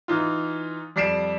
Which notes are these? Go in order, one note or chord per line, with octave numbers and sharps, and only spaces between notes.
E3 D#4 F4
F2 G3 C7 D7 E7